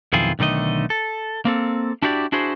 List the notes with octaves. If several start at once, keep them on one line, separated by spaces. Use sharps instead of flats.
B1 F2 D#3 E4 F4 G#4
B1 D3 D#3 A3 D#5
A4
A#3 C4 A4
D4 E4 F#4 G4 C#5 D5
D4 E4 F#4 G#4 C5